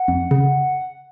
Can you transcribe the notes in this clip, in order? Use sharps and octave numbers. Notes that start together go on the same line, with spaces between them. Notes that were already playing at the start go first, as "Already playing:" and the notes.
Already playing: F#5
F2
C#3